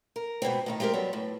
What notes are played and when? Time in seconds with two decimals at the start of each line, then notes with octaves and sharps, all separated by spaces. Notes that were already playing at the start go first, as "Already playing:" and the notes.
0.16 A#4
0.42 G#2 B2 B3 C4
0.66 A2 D#3 D#4
0.80 G#3 C4 G4 G#4 A#4
0.94 F#3 G3 B3
1.13 A2